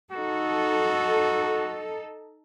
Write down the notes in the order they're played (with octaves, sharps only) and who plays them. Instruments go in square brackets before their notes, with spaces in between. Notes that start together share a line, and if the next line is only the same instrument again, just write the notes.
[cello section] D#4 A4 [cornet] F#4